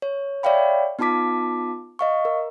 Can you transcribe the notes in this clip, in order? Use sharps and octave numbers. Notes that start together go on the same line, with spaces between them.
C#5
C#5 D5 E5 F5 G5 B5
B3 D#4 F4 A5 D6 B6
D#5 F5 C#6
A#4